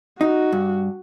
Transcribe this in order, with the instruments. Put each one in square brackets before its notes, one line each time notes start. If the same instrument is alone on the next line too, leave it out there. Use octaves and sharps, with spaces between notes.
[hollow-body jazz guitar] D#4 [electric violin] F#4
[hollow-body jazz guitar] G2